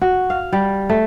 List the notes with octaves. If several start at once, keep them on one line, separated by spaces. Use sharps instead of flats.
F#4
F5
G3
A3